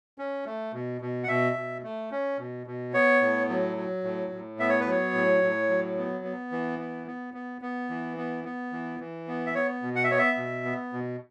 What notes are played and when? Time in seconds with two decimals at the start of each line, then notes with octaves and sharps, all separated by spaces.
0.18 C#4
0.46 A3
0.73 B2
1.01 B2
1.24 F#5
1.28 B2 E5
1.56 B2
1.83 A3
2.11 C#4
2.38 B2
2.67 B2
2.93 B3 C#5
3.21 A2
3.49 F#3
3.77 F#3
4.04 A2
4.32 A2
4.59 B3 E5
4.69 C#5
4.81 B4
4.87 F#3 C#5
5.14 A2
5.42 A2
5.69 F#3
5.97 B3
6.24 B3
6.52 E3
6.79 B3
7.07 B3
7.34 B3
7.62 B3
7.89 E3
8.17 B3
8.44 B3
8.72 E3
9.00 E3
9.28 B3
9.46 E5
9.55 B3 C#5
9.82 B2
9.96 F#5
10.04 E5
10.11 B3 C#5
10.19 E5
10.38 B2
10.65 B3
10.93 B2